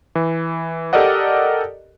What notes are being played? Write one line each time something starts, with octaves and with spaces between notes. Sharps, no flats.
E3
G4 A4 A#4 D5 D#5 F#5